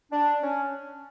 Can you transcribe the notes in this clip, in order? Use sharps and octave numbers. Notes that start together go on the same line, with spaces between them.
D4
C#4